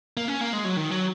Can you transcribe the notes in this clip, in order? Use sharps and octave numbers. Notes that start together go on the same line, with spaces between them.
A#3
C#4
A#3
G#3
F#3
D#3
F#3